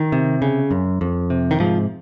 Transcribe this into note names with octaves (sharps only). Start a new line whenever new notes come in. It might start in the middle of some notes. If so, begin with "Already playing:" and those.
Already playing: D#3
C3
C#3
F#2
F2
C3
D#3
G#2 F3